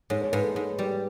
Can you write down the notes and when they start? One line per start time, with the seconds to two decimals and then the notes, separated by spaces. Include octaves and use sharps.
0.10 G#2 C#5
0.21 C#5
0.33 G#2 B4
0.44 A4
0.56 G#2
0.79 G3